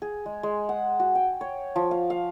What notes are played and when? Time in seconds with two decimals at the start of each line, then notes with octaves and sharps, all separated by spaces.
0.02 G#4
0.26 G#3
0.43 G#3
0.69 F#5
1.00 F#4
1.15 G5
1.41 C#5
1.76 F3
1.91 F5
2.10 F5